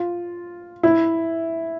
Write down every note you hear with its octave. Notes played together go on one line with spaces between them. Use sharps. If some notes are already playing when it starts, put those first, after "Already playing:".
Already playing: F4
E4